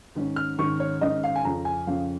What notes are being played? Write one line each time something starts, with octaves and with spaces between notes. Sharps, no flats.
G#2 D#3 C#4
F6
G#2 D#3 C#4 C#6
C#5
G#2 D#3 C#4 D#5
F5
G#5
F2 C#3 F3 C#4 A#5
G#5
F2 C#3 F3 C#4 F5